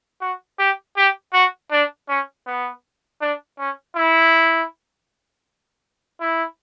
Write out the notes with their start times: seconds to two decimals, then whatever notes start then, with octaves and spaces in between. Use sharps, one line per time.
0.21 F#4
0.59 G4
0.97 G4
1.34 F#4
1.72 D4
2.09 C#4
2.47 B3
3.21 D4
3.59 C#4
3.96 E4
6.21 E4